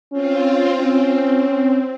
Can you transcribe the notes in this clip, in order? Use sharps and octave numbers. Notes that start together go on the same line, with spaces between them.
C4 C#4 F4
C4 C#4